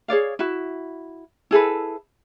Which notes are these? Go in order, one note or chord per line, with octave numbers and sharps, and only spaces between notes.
G#4 C#5 D5 F5
E4 F#4
E4 G#4 A4 B4